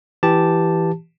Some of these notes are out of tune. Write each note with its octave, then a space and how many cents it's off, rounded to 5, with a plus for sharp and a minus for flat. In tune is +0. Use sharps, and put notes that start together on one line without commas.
E3 +5 G4 +0 A5 +0